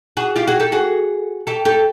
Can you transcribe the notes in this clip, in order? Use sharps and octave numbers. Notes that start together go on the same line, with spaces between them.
F#4 G#4
F4 G4
F#4 G#4
G4 A4
F#4 G#4
G4 A4
G4 A4